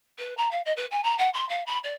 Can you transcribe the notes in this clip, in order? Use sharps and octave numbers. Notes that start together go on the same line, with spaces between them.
B4
A#5
F5
D#5
B4
G#5
A#5
F#5
C6
F5
B5
D5